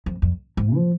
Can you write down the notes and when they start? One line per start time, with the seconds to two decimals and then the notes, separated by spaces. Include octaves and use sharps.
0.06 F2
0.22 F2
0.57 G#2
0.74 F3